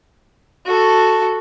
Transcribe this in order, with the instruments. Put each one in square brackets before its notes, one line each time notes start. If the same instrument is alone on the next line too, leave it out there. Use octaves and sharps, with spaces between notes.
[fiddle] F#4 A4